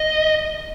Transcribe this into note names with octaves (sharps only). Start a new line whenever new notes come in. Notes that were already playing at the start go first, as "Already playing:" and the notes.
Already playing: D#5